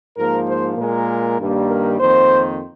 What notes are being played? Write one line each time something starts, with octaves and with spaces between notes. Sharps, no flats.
G#2 F3 A#3 A#4
C5
A#2 G#3 A#4
G2 D#3 G3 A#3
A#4
F2 D#3 A#3 C5